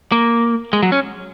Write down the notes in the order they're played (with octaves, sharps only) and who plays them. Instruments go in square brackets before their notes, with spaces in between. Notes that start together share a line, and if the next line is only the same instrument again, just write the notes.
[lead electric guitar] A#3
G#3
F#3
C#4